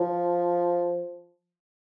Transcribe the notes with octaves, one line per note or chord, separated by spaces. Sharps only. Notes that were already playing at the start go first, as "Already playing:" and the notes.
Already playing: F3